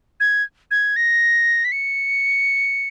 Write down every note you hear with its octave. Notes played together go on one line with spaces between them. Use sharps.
G#6
G#6
A#6
B6
C#7